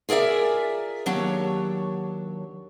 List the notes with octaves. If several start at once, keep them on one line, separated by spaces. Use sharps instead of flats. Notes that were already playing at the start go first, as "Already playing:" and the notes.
F4 G#4 A#4 D5 E5
D#2 F#3 D4 C#5